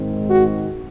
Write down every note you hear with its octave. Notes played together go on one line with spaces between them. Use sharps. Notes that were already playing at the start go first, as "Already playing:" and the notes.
Already playing: G#2 D#3 G#3 C4
F#4